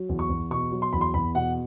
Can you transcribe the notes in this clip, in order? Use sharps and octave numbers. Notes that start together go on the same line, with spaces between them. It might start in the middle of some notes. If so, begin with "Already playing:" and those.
Already playing: F#3
E2
C#6
E2
B2 C#6
F#3
C6
E2 B5
C6
E2 B5
B2 F#5